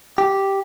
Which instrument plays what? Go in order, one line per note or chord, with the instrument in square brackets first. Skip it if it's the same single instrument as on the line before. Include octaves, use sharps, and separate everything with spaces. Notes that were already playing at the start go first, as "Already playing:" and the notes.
[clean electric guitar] G4